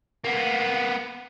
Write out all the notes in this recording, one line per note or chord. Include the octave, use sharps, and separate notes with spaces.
A#3 B3